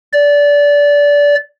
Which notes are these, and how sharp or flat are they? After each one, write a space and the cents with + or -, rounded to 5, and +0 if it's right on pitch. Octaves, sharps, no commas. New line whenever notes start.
D5 -20